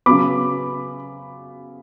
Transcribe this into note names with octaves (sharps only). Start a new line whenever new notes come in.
C#3 F#3 B3 B5 D6